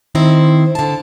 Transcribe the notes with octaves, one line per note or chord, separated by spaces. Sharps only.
D#3 C4 E4 C5
D3 A5